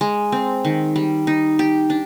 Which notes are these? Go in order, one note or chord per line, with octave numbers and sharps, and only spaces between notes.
G#3
C4
D#3
G3
D#4
G4
D4